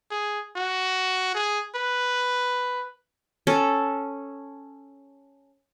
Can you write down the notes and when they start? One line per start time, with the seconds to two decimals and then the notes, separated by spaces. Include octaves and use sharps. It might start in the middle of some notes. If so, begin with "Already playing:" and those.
0.11 G#4
0.56 F#4
1.35 G#4
1.75 B4
3.47 C#4 A4